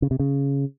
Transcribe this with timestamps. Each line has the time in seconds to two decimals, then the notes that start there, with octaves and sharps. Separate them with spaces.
0.02 C#3
0.11 C3
0.19 C#3